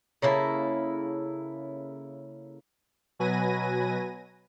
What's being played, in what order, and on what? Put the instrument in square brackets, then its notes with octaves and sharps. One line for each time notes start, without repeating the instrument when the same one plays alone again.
[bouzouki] C#3 A#3 E4 A4
[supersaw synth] B2 F#3 B4 G#5 A#6 D#7